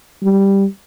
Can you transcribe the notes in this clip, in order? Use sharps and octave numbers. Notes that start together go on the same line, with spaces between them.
G3